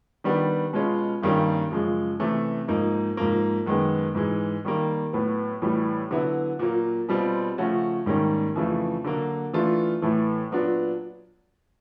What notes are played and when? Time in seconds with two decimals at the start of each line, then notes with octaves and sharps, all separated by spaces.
0.24 D#3 G3 B3 D4
0.73 B2 G#3 C#4 F4
1.22 G2 D#3 G3 A#3 C#4
1.71 F#2 C#3 F3 G#3
2.19 C3 E3 A3 C#4
2.68 G#2 F3 A#3 D#4
3.17 G#2 F3 A#3
3.66 F#2 D#3 G#3 B3
4.15 G#2 E3 G#3
4.65 D#3 G3 A#3
5.13 A2 F#3 B3
5.62 A2 E3 G3
6.11 D3 F#3 B3 E4
6.59 A#2 F#3 A#3
7.09 B2 G3 C4 F4
7.58 C#3 F3 A3 C#4 F#4
8.06 G#2 D#3 G3 A#3 C#4
8.55 F2 C#3 E3 A3
9.04 D3 F#3 A#3
9.53 E3 A3 D4 F4
10.02 A2 E3 A3
10.52 A#2 F#3 B3 D4 F4